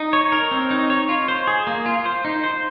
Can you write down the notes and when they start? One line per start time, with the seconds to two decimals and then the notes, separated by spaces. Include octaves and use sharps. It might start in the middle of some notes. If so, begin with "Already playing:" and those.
Already playing: D#4
0.13 C#5
0.32 A#4
0.51 C4
0.71 D#4
0.90 C#5
1.09 F4
1.28 C5
1.47 G#4
1.67 A#3
1.86 F4
2.05 C5
2.25 D#4
2.43 C5